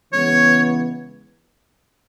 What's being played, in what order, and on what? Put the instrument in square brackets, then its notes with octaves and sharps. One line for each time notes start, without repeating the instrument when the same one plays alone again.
[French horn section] C#3 E3 G#3 B3 [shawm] C#5